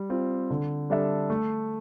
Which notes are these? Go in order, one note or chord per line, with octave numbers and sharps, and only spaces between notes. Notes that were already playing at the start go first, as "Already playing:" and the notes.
Already playing: G3
C4 F4
D3
G3 D4 A4 E5
A3